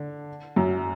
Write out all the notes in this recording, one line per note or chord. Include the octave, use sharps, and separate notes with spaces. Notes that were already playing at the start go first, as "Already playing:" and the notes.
Already playing: D3
F#2 F#3